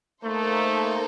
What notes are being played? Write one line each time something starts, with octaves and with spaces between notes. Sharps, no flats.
A3 A#3 D#4 A4 C5